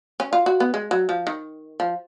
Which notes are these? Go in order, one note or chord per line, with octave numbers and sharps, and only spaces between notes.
C#4
F4
F#4
B3
G#3
F#3
F3
D#3
F3